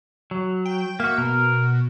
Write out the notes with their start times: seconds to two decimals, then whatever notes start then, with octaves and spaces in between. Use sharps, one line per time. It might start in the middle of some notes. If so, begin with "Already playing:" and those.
0.31 F#3
0.66 G5
1.00 A#3 F#4 E5
1.18 B2 A#4